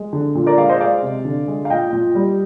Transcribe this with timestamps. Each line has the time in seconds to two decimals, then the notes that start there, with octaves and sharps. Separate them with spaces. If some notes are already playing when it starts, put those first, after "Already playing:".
Already playing: G#3
0.13 D3
0.35 A#2
0.46 A#4 D5
0.58 G#3 D5 F5
0.69 C5 D#5
0.80 G#3 D5 F5
1.02 C3
1.25 D3
1.48 G#3
1.65 F5
1.70 A#2 D#5 G5
1.93 A#2
2.15 G3